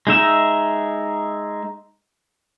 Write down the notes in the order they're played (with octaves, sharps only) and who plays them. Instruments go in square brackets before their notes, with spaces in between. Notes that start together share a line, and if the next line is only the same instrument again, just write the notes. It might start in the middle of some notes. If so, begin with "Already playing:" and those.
[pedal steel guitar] G#3 D#4 E5